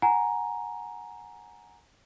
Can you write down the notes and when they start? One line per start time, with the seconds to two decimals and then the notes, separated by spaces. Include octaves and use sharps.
0.02 F#5 G#5 A#5